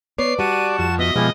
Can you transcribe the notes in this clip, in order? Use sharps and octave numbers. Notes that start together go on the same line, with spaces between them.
B3 B4 C#5 D5 C7
G3 F#4 F#5 A5 C#6 D#7
F2 E7
B3 F#4 D#5 E5 D#6
B2 F3 G#3 B3 C#4 E4 G4